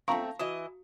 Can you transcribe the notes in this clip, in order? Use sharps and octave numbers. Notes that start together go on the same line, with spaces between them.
A3 C4 F5 A5 A#5 C#6
E3 E4 F#4 D#5